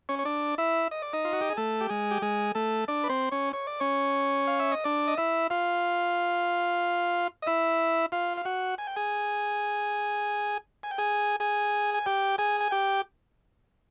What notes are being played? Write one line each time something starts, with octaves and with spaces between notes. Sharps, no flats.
C#4 C#5
C#5
D4 D5
E4 E5
D#5
D5
D#4 D#5
F4
F#4
G4
G#4
A3 A4
G4
G#3 G#4
G4
G#3 G#4
A3 A4
D4 D5
B4
C4 C5
C#4 C#5
C#5
D5
C#4 C#5
F5
E5
D#5
D4 D5
D#5
E4 E5
F4 F5
D#5
E4 E5
F4 F5
F5
F#4 F#5
G#5
G5
G#4 G#5
G#5
G5
G#4 G#5
G#4 G#5
G#5
G4 G5
G#4 G#5
G#5
G4 G5